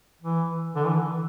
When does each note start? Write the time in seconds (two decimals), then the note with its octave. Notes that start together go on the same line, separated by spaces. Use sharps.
0.23 E3
0.76 D3
0.85 E3